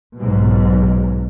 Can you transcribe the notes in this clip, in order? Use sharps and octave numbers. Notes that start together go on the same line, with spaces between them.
B1 G#2 B2